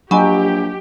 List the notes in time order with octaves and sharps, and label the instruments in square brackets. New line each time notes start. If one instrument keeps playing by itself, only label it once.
[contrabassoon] A#1 [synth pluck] F#3 [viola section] G4 [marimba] D#5 G#5 B5